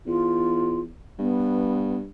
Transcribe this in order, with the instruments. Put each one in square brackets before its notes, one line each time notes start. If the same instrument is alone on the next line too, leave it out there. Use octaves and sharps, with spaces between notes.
[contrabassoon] E2 [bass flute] F4
[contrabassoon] G2 [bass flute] B3